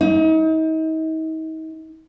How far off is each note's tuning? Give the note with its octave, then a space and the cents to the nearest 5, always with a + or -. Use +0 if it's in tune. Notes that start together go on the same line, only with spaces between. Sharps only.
D#4 +40